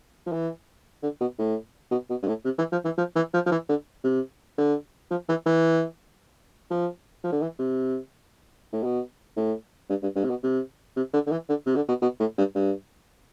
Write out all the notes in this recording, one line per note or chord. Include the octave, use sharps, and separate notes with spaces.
F3
E3
D3
B2
A2
B2
B2
G2
A2
C3
E3
F3
E3
F3
E3
F3
F3
E3
D3
C3
D3
F3
E3
E3
F3
F3
D3
E3
C3
A2
B2
A2
G2
G2
G2
C3
B2
C3
C3
D3
D3
E3
D3
C3
D3
B2
B2
A2
G2
G2